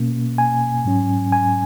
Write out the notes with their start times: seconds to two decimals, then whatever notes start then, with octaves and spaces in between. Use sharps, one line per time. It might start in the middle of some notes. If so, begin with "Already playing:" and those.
Already playing: B2 A#3 C#4
0.38 G#5
0.85 G#2 F#3 C#4
1.32 G#5